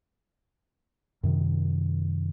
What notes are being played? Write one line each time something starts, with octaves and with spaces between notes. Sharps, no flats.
F#2 C3 D#3